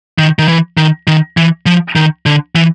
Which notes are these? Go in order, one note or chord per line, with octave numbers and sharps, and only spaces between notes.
D#3
D#3
E3
D#3
D#3
E3
F3
D#3
D3
E3